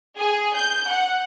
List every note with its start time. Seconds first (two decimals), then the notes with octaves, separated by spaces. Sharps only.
0.17 G#4
0.55 G6
0.89 F#5